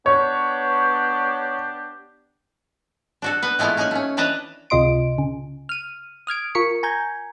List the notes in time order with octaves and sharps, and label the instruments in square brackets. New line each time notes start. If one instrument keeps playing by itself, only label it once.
[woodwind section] B3 D4 G4 [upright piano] C#5
[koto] D4 F#4 A4
B3 B4
E3 G#3 A3 B3 E4 F4
A#3 C#4 D#4 F#5 G#5
A3 C#4
E3 D4 B4 D#5 A5 A#5
[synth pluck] C#2 C3 F4 D#5 C6 D7
C#3
F6 D#7
D#6 F6 G#6 D7
F4 A#4 C#6 B6 C#7
G#5 A#5 G6 G#6